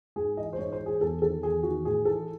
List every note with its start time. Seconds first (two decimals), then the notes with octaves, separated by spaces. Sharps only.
0.16 G#2 G#4
0.37 E3 D#5
0.53 C5
0.58 G#2 C#5
0.72 C5
0.79 E3
0.86 G#4
1.01 E2 A4
1.22 D#3 A4
1.42 E2 G#4
1.63 D#3 F#4
1.85 A2 G#4
2.05 E3 A4